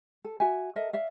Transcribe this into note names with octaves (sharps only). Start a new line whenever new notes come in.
A4
F#4 E5 G#5
A4 A#4 D#5 E5
D5 E5 F5